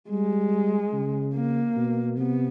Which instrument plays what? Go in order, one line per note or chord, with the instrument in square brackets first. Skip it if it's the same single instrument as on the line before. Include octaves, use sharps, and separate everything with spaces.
[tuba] G3 [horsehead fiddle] G#3
[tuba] C#3
[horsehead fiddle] A#3
[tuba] B2
[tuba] C3 [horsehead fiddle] B3